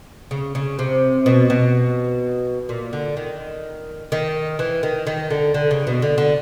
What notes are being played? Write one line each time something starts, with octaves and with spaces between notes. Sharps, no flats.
C#3
C#3
C3
B2
B2
A#2
D3
D#3
D#3
E3
D#3
D#3
D3
D3
C#3
B2
D3
D3